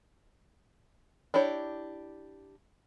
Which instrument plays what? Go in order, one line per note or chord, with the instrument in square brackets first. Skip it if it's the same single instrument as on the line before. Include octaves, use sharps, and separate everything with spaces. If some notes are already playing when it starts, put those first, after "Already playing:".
[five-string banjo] D4 E4 G4 C#5